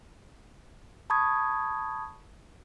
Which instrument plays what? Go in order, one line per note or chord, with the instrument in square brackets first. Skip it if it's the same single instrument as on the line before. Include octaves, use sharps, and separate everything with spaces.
[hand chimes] A5 B5 C#6 D#6 G#6